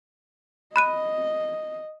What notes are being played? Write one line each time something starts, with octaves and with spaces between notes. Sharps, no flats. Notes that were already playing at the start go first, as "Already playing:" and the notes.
D#5 B5 F#6 D#7